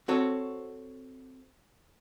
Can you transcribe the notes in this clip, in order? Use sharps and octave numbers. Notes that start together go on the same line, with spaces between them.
C4 F#4 A4 C#5